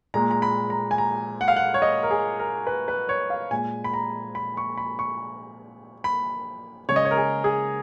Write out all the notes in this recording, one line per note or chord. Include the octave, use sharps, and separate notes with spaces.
A#2 G#3 A#5
A#5
B5
A#5
G#5
A#5
F#5
F5
F#5
C#5
D#5
A#4
G#4
A#4
B4
B4
C#5
F5
A#2 G#3 G#5
B5
A#5
B5
C#6
B5
C#6
B5
C#3 G#3 C#5
D#5
C#5
A#4
G#4
G#4